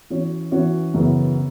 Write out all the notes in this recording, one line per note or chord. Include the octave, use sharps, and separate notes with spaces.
E3 C#4 F#4 C#5
E3 C#4 F#4 C#5
F#2 C#3 E3 B3